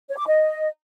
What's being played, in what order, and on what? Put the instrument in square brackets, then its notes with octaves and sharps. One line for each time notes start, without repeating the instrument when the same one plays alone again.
[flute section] C#5
D6
D#5